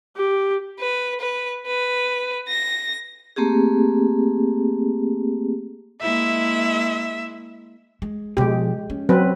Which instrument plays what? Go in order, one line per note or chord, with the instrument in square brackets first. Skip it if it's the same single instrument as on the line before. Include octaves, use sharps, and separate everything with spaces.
[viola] G4
[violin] B4
B4
B4
A#6
[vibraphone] A3 A#3 C4 G4 G#4
[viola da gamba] G#3 A#3 E4 [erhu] E5
[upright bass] G#3
[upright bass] B2 F3 [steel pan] G#3 G4
[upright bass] C#4
[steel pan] F#3 C4 B4